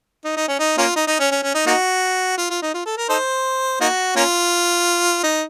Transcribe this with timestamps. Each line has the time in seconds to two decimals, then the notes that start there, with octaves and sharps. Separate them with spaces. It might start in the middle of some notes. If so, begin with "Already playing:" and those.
0.25 D#4
0.37 D#4
0.48 C#4
0.60 D#4
0.78 A#3 C#4 F4
0.96 D#4
1.07 D#4
1.20 C#4
1.31 C#4
1.43 C#4
1.55 D#4
1.67 A#3 D#4 F#4
2.38 F4
2.50 F4
2.62 D#4
2.74 F4
2.86 A4
2.97 A#4
3.09 D#4 A4 C5
3.81 A#3 D#4 F#4
4.16 A#3 C#4 F4
5.23 D#4